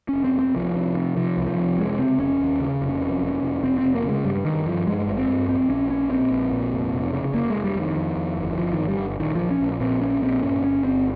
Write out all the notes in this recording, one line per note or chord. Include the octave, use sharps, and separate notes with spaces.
F1 C#4
C4
F1
C4
C2 F3
C3
C3
C3 F3
C2
F3
C3
F1 G#3
C#3 C4
F1 C#4
D#2
C#3
F1
F2
F1
F1
F1 C4
C4
F1
A#3
C#3 G#3
G2 G3
G2 D#3
G2 F3
G2 G#3
G#1
C4
G2
A#1 C4
A#1 C#4
A#2 C#4
A#2 C4
A#1
A#2
F1
F1
C#3
F1 A#3
G#3
F1
G3
F2 D#3
F2
F2
G1
G1 F3
G1 D#3
G3
G1
A#1 D#3
A#1 F3
C#4
A#1
A#2 C4
A#1 C#4
A#2 C4
G2 C#4
G1 C#4
G1 C4